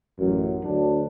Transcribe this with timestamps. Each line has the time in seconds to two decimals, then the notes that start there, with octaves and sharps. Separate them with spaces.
0.20 A1 F#2
0.65 D2 F#3 D4